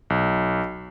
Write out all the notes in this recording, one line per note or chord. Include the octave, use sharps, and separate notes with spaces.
B1